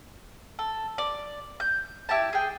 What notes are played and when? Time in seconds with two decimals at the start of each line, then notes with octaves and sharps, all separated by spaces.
0.59 A4
0.98 D5
1.60 G6
2.09 E4 G4 A5
2.33 G#4 G5